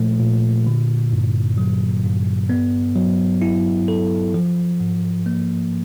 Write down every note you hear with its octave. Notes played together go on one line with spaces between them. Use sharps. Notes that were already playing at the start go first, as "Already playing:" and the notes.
Already playing: A#2 F3 A3
A#2
D3
G2
F#3
G2
B3
F#3
E4
A4
F3
G#2
A#3